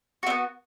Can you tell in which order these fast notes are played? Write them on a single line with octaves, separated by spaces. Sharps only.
F#4 C4 B3